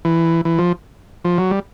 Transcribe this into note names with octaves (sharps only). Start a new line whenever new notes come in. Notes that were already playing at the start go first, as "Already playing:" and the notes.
E3
E3
F3
F3
F#3
G3